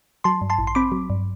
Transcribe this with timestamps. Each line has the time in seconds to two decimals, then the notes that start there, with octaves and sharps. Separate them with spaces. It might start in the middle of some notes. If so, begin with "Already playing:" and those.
0.24 F#3 A5 C6
0.41 G2
0.50 A5 C6
0.58 A1
0.67 C6
0.75 C4 B5 D6
0.92 F#3
1.10 G2